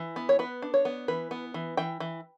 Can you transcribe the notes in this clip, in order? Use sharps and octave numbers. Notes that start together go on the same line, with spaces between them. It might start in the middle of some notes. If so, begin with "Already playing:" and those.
Already playing: E3
B3
C#5
B3 B4
D4
C#5
B3
E3 B4
B3
E3
E3 G5
E3